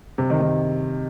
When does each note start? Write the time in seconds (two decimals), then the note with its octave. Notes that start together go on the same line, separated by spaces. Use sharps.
0.18 C3
0.30 D#3
0.41 D#3